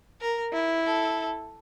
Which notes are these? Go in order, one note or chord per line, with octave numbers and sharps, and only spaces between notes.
A#4
E4
A4